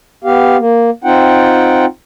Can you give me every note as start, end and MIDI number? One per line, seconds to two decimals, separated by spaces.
0.24 0.57 59
0.24 0.57 67
0.24 0.57 77
0.58 0.90 58
1.04 1.85 60
1.04 1.85 63
1.04 1.85 65
1.04 1.85 78
1.04 1.85 79